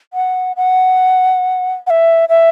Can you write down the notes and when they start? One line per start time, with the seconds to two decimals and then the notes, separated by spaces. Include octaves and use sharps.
0.14 F#5
0.57 F#5
1.87 F#5
1.90 E5
2.29 E5